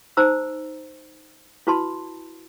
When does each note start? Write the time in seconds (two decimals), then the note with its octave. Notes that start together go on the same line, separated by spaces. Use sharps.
0.17 D#4 C5 A#5 E6
1.67 E4 F#4 B4 A5 B5 C6